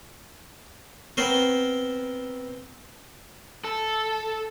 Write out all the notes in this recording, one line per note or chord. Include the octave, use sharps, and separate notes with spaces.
B3 C4 A#4 C5
A4